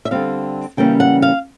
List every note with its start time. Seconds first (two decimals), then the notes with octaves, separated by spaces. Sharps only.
0.05 E5
0.11 D3 G3 C4 F5
0.77 C#3 E3 G3 A#3 C#4 G5
1.00 F#5
1.22 F5